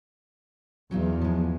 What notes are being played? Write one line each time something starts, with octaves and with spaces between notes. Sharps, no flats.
E2 F#3 D#4 F4
F3 G#3